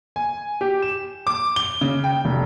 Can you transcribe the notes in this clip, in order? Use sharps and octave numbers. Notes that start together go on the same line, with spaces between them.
G#5
G4
E7
D6
G7
C#3
G5
F1